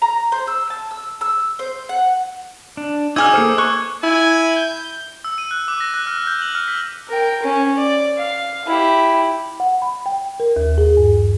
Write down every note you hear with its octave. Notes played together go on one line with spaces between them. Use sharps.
A#5
C5
E6
A5
E6
E6
C5
F#5
D4
F#3 D#4 G#4 D6 E6 F6 G#6
A#3 A4 C5
G#5 C#6 F#6
E4 G#5
G6
E6
D#7
F#6
D6
A#6
F#6
F6
G6
F#7
F6
B6
A#4 G5
C#4
D5
F5
E4 G4
F#5
B5
G5
A#4
D#2
G#4
G2